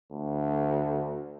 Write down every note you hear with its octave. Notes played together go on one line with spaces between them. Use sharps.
D2